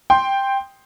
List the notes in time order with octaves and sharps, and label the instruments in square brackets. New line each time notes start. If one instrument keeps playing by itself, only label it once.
[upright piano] G5 C6